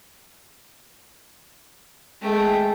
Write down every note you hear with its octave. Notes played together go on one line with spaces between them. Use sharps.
G#3 A3 G5